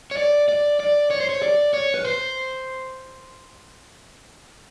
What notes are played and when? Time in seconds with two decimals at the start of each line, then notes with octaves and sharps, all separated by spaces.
0.11 C#5
0.17 D5
0.49 D5
0.80 D5
1.10 C#5
1.20 C5
1.29 C#5
1.43 D5
1.74 C#5
1.94 B4
2.05 C5